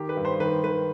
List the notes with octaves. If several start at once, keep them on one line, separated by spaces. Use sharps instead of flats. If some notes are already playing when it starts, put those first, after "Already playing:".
Already playing: D#3 G4
B4
G2
C5
D#3 B4
D#3 B4